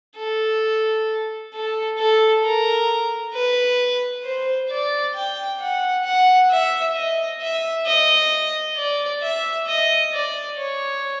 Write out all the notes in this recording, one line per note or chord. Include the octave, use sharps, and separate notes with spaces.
A4
A4
A4
A#4
B4
C5
D5
G5
F#5
F#5
E5
D#5
E5
D#5
D5
E5
D#5
D5
C#5